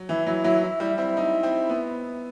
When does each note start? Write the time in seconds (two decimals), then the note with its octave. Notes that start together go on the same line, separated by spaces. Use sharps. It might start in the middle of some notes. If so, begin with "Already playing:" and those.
Already playing: F#3
0.09 E3 E4
0.26 F#3 E4
0.44 F#3 E4
0.63 E4
0.80 G3 E4
0.98 C4 E4
1.17 D#4
1.43 C4
1.69 B3